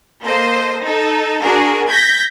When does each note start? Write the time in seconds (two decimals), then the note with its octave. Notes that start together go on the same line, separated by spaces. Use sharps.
0.24 A#3 A4 C5 D#5
0.83 D#4 A4
1.43 D4 F#4 G#4 A#4
1.88 G6 G#6 A#6 B6